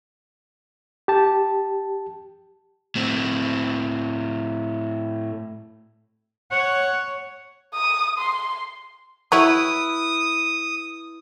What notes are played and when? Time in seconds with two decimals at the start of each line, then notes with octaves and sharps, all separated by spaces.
1.08 G4 A5
2.95 A2 C4
6.51 C#5 F#5
7.75 D#6
8.19 C6
9.32 F#3 E4 G4 B4 C#5 D#6